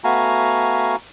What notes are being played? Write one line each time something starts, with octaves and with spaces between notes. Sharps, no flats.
A3 B3 F#4 F5 G#5 A#5